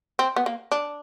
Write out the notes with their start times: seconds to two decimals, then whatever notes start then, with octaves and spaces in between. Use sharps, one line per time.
0.19 C4
0.36 B3
0.46 A#3
0.72 D4